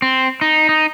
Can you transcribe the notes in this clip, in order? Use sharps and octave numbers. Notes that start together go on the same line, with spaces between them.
C4
D#4
D#4